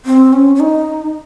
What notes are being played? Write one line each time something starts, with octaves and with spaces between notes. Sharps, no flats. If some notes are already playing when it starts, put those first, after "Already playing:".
C4
C#4
C#4
D#4